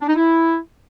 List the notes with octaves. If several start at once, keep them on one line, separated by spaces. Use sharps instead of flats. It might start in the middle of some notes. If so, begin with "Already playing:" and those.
D4
D#4
E4